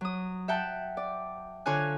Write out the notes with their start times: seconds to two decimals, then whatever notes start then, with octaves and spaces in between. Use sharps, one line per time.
0.01 F#3 D#6
0.48 E5 F#5 G5 A5
0.97 D5
1.66 D3 F4 C#5 G#5 F#6